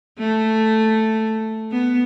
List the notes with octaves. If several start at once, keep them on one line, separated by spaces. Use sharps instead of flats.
A3
B3